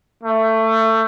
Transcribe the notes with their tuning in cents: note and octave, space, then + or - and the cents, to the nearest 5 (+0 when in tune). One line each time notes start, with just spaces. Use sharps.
A3 +20